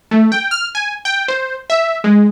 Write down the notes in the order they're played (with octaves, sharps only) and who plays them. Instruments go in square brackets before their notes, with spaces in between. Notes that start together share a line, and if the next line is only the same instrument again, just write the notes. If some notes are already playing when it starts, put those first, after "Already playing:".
[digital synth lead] A3
G5
F6
G#5
G5
C5
E5
G#3